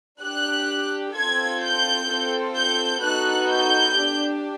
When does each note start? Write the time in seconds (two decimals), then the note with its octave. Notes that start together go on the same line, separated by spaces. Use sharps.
0.22 D4 G4 F#6
1.15 C4 F4 A4 G#6
1.62 G6
2.09 C4 F4 A4
2.56 G6
3.02 B3 D#4 F#4 A4 F#6
3.50 G6
3.97 D4 G4